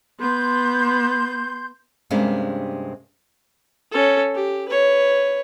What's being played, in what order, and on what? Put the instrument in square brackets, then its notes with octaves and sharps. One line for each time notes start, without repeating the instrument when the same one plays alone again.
[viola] B3 [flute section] C6 G6
[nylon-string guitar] G2 C3 G#3 A#3 C#4 D4
[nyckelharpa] C#4 A4
G4
B4 C#5